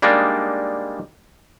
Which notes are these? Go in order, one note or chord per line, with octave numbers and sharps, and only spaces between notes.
G3 G#3 A#3 D4 D#4